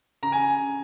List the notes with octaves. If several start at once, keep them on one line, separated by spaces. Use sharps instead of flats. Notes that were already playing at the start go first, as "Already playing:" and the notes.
C#3 A#5
G#5